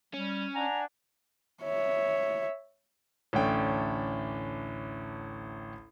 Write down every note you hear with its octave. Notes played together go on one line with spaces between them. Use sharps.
G3 C#4
D4 F#5 G#5 A#5
C#5 E5
A1 D2 A3 C#4 D4 G5